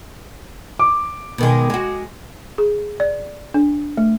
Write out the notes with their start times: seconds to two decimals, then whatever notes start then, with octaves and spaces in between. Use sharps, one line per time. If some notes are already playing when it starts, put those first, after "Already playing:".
0.79 D6
1.38 B2 D#3 G#3
1.70 G#3 F#4
2.58 G#4
3.00 D5
3.54 D4
3.97 A3